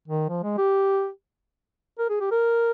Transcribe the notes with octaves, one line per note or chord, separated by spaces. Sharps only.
D#3
F3
G#3
G4
A#4
G#4
G4
A#4